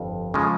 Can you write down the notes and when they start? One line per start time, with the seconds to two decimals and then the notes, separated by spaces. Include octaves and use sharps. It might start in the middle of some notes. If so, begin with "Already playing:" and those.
Already playing: G1 F2
0.34 C#3 F3 G#3